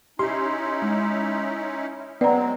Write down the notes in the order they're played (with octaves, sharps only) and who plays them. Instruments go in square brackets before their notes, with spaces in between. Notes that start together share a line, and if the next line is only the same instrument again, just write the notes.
[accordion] C#4 D#4 E4 [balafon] G4 [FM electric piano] C6
[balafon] G#3
[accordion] F#3 G#3 C4 [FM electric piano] B3 [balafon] D5 F#5 A#5